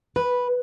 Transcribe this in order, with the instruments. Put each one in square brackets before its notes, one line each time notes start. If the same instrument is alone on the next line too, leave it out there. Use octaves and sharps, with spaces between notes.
[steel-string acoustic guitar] B4